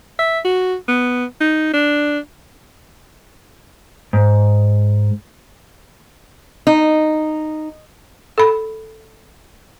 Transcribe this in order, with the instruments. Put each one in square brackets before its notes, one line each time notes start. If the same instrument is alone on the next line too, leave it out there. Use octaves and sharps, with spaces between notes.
[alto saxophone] E5
F#4
B3
D#4
D4
[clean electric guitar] G#2
[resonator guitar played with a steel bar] D#4
[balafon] A4 B5